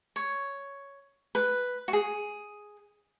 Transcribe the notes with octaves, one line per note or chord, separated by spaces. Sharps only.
C#5
B4
F#4
G#4